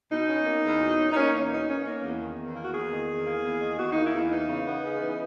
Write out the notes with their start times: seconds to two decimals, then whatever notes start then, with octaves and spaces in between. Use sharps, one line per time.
0.11 B2 D#4
0.28 C#4
0.46 A#3
0.63 E2
0.81 B2
0.99 C#4
1.11 D#4
1.16 A#3 C#4
1.33 E2
1.51 B2 D#4
1.68 C#4
1.86 A#3
2.03 E2
2.21 D#3
2.39 E2
2.55 A#3
2.63 F#4
2.73 E2 G#4
2.91 D#3
3.09 E2
3.26 A#3
3.44 E2
3.61 D#3
3.78 E2 F#4
3.91 A#3 D#4
4.05 E4
4.13 E2
4.31 E3 D#4
4.48 C#3
4.66 B3
4.84 C#3
5.01 E3